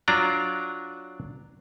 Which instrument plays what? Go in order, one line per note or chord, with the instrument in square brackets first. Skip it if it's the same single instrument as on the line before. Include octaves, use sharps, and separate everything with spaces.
[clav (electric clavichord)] F#3 D4 F4 D5 A#5